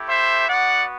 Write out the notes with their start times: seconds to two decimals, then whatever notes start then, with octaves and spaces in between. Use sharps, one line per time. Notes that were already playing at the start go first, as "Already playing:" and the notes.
Already playing: A3 E4 G4
0.09 C5 E5
0.49 B3 F#4 D5 F#5